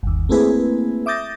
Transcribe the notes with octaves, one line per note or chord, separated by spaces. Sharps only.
G1 D#2
A3 A#3 C4 E4 G#4 B4
E5 D6 D#6 G6 A6 A#6